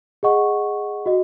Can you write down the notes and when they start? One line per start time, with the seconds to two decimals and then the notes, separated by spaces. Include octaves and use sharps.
0.23 G#4 D#5 F#5 C#6
1.06 F#4 D#5